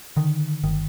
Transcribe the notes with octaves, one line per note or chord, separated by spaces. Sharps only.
D3 D#3
G1 D#3